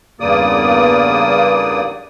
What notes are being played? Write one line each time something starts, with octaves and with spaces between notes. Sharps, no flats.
E2 G2 C#3 A#3 D5 D#6